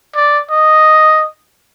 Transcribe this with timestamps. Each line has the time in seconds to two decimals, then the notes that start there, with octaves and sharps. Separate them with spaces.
0.16 D5
0.51 D#5